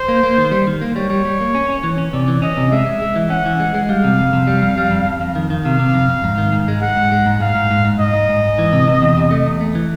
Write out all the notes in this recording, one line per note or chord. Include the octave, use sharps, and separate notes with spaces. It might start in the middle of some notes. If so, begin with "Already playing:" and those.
Already playing: C5
A#3
A#3
D#3
G3
D#3
A#3
G3 C#5
G3
G3
A#3
C#4
C#4
E3
C#4
C3 D5
E3
C#4 D#5
C3
G#3 E5
G#3
G#3
E3
C#4 F#5
E3
G#3
G#3
G3 F5
C3
F2
C3
G3
F2
G3
F2
F2
F2
D#3
D#3
C3 F5
C3
F2
F2
G#2
D#3
G#2
G#3
G#3 F#5
G#2
G#3
G#2
G#2 F5
G#2
G#2
G#2
G#2 D#5
G#2
G#2
G#2
E3
C3
C3
E2
C3
A3
E2
A3
E3